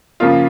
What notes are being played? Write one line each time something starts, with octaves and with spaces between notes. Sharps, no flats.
C#3 F3 A#3 F4